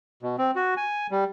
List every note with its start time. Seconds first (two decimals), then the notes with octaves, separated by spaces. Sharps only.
0.22 B2
0.38 C4
0.56 F#4
0.77 G#5
1.11 G3